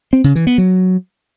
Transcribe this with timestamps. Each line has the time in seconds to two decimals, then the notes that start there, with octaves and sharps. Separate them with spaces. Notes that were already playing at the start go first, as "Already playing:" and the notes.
0.13 C4
0.24 C#3
0.35 E3
0.47 B3
0.58 F#3